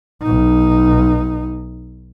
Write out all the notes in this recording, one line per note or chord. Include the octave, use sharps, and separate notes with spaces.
B1 D#4